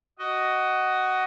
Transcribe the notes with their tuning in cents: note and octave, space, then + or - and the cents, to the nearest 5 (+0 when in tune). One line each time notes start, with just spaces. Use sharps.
F#4 +15 D#5 +0